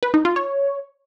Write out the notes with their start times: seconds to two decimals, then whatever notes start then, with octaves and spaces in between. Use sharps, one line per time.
0.03 B4
0.14 D#4
0.25 F4
0.36 C#5